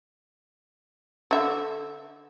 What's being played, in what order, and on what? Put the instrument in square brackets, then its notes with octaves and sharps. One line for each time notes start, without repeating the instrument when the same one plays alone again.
[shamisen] D3 E5